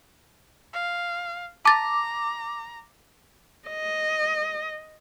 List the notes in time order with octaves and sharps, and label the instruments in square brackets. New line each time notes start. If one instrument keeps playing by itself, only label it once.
[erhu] F5
[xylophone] A5 A6 [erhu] A#5 [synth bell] D6
[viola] D#5